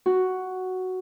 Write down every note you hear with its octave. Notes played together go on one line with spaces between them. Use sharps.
F#4